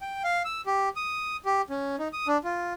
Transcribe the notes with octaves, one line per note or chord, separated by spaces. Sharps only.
G5
F5
E6
G4
D#6
G4
C#4
D#4
D#6
D4
F4